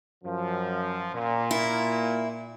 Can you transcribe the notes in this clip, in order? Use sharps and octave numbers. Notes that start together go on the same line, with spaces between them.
F#2 F3
A#2
E4